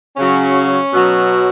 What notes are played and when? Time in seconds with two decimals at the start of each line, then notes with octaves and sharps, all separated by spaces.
0.17 C#3 F#3 C#4
0.93 B2 F#3